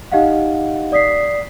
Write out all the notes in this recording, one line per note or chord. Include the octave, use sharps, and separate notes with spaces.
D#4 G4 D#5 F5 F#5
D5 D#6 B6 C7